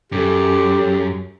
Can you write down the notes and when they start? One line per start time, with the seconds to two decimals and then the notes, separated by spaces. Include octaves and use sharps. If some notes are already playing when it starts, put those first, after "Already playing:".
0.12 F#2 G4 A4